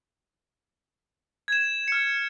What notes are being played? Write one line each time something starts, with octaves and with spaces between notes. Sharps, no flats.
G#6 E7
F6 C#7